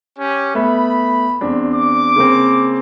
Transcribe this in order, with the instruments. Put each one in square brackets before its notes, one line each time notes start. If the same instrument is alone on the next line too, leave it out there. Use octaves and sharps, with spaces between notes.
[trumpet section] C#4 G4
[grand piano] A3 B3 E5 [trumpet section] B5
[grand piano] E2 C4 D4
[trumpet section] D6
[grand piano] C#3 A#3 C4